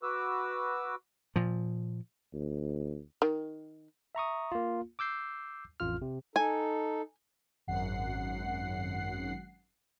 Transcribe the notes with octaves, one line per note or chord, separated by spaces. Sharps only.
F#4 B4 D6 E6
A#2 F3
D2
D#3
E5 A#5 C#6 D#6
A#3 F4
D6 E6 G6 C7
A1 F2 F4 F6
C3
D#4 A4 G#5
G#1 F#2 F#5 C7